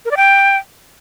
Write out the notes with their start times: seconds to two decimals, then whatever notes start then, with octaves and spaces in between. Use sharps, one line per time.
0.05 A#4
0.11 D5
0.17 G5